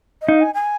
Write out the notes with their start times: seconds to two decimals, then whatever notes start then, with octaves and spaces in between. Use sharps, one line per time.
0.21 D#5
0.28 D#4 F5
0.41 G#5
0.55 G#5